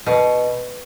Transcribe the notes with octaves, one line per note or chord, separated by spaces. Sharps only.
B2